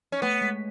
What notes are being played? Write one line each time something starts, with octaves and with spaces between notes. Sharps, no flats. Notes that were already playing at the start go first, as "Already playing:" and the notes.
C#4
A3 B3
G#3